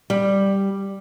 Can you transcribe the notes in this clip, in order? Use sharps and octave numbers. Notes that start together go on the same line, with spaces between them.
G3